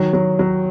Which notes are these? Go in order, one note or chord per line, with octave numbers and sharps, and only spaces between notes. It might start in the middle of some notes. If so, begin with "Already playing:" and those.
Already playing: D#3 F#3
F#3
F#3